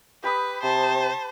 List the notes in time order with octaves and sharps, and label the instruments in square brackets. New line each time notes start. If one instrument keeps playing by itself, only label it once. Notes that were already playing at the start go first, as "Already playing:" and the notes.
[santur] G4 B5 D#6 [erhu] B4
[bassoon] C3 [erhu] C5 [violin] A5